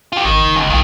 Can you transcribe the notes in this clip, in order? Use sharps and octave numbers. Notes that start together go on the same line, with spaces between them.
F4 G4
G#1 D#3
F#1
C#2
B1 G2 D#3